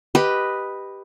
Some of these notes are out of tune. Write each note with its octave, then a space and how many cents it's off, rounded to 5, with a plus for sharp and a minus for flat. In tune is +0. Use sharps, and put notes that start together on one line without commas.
G4 +0 B4 +0 D#5 +0